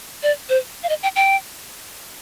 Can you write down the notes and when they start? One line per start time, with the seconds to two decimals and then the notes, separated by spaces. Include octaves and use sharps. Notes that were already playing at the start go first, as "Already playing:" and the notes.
0.23 D5
0.49 C5
0.83 F5
0.89 D#5
1.03 G5
1.16 G5